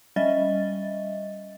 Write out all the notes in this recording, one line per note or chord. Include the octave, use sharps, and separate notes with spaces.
G3 C#4 D#5 E5 A6